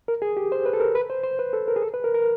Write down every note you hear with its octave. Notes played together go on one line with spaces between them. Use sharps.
A#4
G#4
G4
C5
B4
A4
A#4
B4
C5
C5
B4
A4
A#4
G#4
A4
B4
A#4
A#4